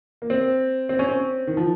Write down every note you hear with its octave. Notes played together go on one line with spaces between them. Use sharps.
A#3
C4
C4
C#4
C4
D#3
F3